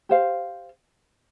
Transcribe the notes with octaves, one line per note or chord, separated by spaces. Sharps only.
G4 C5 F5